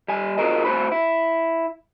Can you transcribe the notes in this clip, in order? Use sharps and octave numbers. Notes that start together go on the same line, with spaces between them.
G3 G#5
F4 F#4 G#4 A#4 C5 D#5
A2 F#4 C5 B5
E4